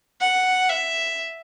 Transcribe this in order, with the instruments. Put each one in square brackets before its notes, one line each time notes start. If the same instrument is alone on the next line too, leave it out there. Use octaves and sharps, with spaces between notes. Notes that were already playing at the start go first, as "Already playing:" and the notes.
[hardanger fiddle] F#5
E5